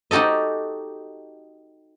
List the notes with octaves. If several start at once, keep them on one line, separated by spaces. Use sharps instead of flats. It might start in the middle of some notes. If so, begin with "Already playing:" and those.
D#4 F#4 G4 A4 D#5